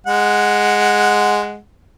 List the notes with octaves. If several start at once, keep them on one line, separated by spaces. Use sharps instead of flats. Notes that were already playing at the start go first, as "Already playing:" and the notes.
G#3 F#5